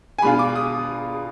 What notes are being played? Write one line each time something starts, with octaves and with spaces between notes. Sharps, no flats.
G#5
B2 G#3 D4 F4 B5
D6
D#6